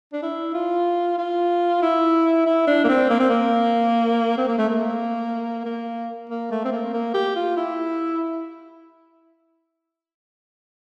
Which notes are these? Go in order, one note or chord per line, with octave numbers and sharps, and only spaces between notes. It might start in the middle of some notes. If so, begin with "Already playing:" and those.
D4
E4
F4
F4
E4
E4
D4
A#3
C4
A#3
C4
A#3
C4
A#3
A3
A#3
A#3
A#3
A3
C4
A#3
A#3
G4
F4
E4